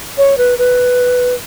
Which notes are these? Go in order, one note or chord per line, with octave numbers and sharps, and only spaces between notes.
C#5
B4
B4